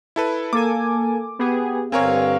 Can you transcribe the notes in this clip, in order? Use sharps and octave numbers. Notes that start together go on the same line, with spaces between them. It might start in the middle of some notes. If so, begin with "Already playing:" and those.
E4 A4 B4
A#3 A4 G#5 D6
B3 G4 G#4
G2 D3 C4 A#4 C#5 F5 G#5